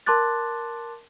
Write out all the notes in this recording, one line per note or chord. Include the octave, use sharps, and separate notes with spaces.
A#4 A5 C6 D6 F#6 A6